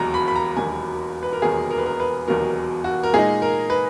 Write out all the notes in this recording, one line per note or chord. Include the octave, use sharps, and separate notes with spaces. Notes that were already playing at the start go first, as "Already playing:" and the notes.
Already playing: E1 D#2 D#3 F#3 A#5
B5
B5
A#5
E1 D#2 D#3 F#3 G#5
B4
A#4
E1 D#2 D#3 F#3 G#4
A#4
B4
A#4
B4
E1 D#2 D#3 F#3 A#4
F#4
A#4
A#2 G#3 D#4 G#4
A#4
B4